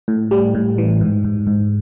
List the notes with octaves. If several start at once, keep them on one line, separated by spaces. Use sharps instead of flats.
A2
G3
A2
E3
G#2
G#2
G#2